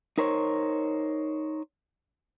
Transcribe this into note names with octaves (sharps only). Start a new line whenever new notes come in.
D#4 A#4 C5 C#5